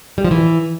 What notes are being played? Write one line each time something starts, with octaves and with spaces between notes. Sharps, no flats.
G3
F3
E3